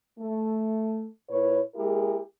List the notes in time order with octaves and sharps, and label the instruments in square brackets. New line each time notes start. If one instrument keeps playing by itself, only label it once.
[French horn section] A3
A#2 E4 B4 C#5
G#3 A#3 E4 G4 G#4 A#4